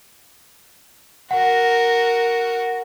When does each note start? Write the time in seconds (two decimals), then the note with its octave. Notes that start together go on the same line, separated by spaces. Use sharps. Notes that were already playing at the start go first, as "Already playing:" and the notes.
1.31 F#4 A#4 F#5